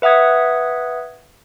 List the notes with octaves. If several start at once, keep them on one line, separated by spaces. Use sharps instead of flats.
B4 E5 F#5 D#6 G#6